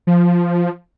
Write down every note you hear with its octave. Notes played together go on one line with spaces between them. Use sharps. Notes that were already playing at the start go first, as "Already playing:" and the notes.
F3